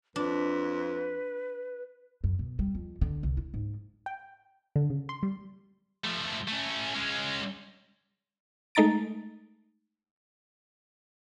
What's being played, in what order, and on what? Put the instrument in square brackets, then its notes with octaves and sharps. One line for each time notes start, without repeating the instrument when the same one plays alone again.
[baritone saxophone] F2 [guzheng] D4 [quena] B4
[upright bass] F#2
B2
G3
F2
D3
C2
E4
G#2
[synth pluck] G5
D3
C#3
C6
G3
[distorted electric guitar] F3 A3
A3 C#4
G#3 C#4
[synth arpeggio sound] G#3 A3 D#4 A#5 A6 D7